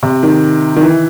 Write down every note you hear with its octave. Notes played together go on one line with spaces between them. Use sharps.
C3
D#3
D#3
E3